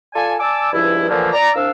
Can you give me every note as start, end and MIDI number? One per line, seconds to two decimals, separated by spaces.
0.14 0.34 65
0.14 0.34 69
0.14 0.34 74
0.14 0.34 80
0.40 0.70 74
0.40 0.70 80
0.40 0.70 81
0.40 0.70 86
0.40 0.70 88
0.73 1.09 37
0.73 1.09 43
0.73 1.09 53
0.73 1.09 64
1.09 1.31 46
1.09 1.31 50
1.09 1.31 52
1.09 1.31 53
1.09 1.31 57
1.09 1.31 58
1.31 1.49 74
1.31 1.49 82
1.54 1.70 36
1.54 1.70 48
1.54 1.70 62
1.54 1.70 77
1.54 1.70 88